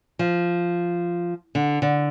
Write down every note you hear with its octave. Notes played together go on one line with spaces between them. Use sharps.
F3
D3
D3